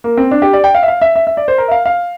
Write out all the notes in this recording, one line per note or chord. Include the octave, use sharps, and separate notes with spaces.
A#3
C4
D4
G4
D5
G5
F5
E5
F5
E5
E5
E5
D5
C5
A#4
E5
F5
F5